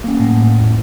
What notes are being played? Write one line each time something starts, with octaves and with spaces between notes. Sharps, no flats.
A#3 C#4
A2
E2